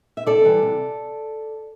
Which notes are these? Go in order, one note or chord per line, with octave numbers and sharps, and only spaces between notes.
E5
C3 A4 D5
E3 G3
C3